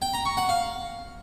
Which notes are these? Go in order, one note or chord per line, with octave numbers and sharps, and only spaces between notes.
G5
A#5
C#6
F#5
F5